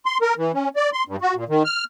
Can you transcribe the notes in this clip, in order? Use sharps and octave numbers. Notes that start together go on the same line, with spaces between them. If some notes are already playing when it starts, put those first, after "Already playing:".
C6
A#4
E3
C#4
D5
C6
G2
F#4
A#2
D#3
F6